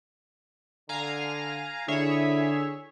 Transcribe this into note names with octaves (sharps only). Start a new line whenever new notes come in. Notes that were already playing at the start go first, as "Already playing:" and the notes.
D3 F5 G#5 A#5
D3 E4 G#4 C#5 E5